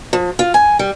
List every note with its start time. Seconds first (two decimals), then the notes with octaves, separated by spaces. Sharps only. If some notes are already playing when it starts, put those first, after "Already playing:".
0.13 F3
0.39 F4
0.54 G#5
0.79 G3